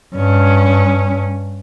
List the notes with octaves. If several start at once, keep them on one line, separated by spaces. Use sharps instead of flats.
G2 C#4